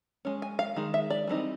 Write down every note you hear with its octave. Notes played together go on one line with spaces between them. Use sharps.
G#3 C#4
G#5
F5
D#3 G#3
E5
D5
E3 G3 C4 D#4